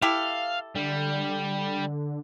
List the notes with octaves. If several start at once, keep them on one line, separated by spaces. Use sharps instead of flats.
E4 G4 A4 F5
D3 G3